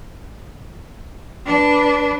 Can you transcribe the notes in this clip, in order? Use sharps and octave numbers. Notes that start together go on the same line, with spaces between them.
D4 B4